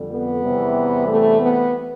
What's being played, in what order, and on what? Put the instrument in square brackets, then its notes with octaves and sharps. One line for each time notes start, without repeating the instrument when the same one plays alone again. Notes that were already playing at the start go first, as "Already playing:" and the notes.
Already playing: [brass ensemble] F2 D3 G3
B3
E2 C3 E3 G3
A3
B3